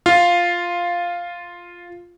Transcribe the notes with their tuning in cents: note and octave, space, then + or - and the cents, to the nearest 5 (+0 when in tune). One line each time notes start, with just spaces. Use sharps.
F4 +0 F5 +0